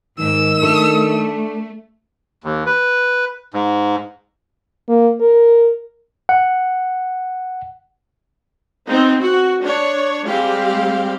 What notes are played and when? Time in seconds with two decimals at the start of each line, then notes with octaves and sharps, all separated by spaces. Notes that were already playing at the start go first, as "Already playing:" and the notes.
0.19 G#2 D#3 E6
0.62 A3 D4 A4
2.44 D#2
2.66 B4
3.54 G#2
4.89 A#3
5.21 A#4
6.29 F#5
8.87 B3 C4 D#4
9.21 F#4
9.62 D4 C#5
10.26 G3 G#3 C4 G4 F5